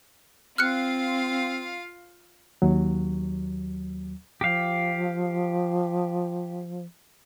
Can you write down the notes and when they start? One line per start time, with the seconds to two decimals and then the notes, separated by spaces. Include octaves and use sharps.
0.58 C4 F4 F5 F6 F#6 C#7
2.62 D#2 F#3
4.41 F3 G4 F5